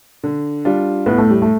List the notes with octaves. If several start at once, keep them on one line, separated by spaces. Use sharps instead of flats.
D3
G3 D4 F4
A2 B3
A3
G3
A3